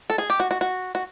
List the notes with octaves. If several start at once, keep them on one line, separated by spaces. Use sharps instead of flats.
A4
G#4
G4
F#4
F#4
F#4
F#4